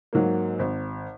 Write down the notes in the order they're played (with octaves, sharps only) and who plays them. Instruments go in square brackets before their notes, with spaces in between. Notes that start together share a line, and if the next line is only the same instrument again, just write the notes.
[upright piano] G#2 F#3 A#3
G#1